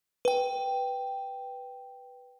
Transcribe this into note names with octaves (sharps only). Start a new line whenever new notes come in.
B4 G5